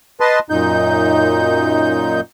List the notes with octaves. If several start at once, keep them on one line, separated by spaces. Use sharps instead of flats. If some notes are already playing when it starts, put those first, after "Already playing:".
B4 D#5 A5 C6
F#2 A#2 D#4 G6